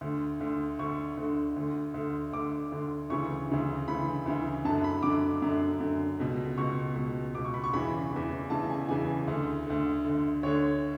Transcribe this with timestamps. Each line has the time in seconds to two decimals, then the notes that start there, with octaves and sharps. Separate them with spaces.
0.01 D2 D3
0.40 D2 D3
0.79 D2 D3 C#6
1.17 D2 D3
1.56 D2 D3
1.94 D2 D3
2.33 D2 D3 D6
2.72 D2 D3
3.10 D2 C#3 E3 C#6
3.49 D2 C#3 E3
3.88 D2 C#3 E3 B5
4.26 D2 C#3 E3
4.65 F#2 D3 A5
4.84 B5
5.03 F#2 D3 D6
5.42 F#2 D3
5.80 F#2 D3
6.20 C#2 B2
6.58 C#2 B2 C#6
6.96 C#2 B2
7.35 C#2 B2 D6
7.45 C#6
7.54 B5
7.64 C#6
7.73 E2 C#3 E3 B5
8.12 E2 C#3 E3
8.50 E2 C#3 E3 A5
8.70 G#5
8.88 E2 C#3 E3 G#5
9.27 D2 D3
9.66 D2 D3
10.05 D2 D3
10.43 D2 D3 C#5